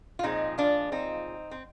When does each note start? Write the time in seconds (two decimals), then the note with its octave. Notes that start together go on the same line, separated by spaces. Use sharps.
0.19 F4
0.23 A#2 F3 G#3 C4 D#4
0.58 D4 F4
0.92 C4 D#4
1.51 C4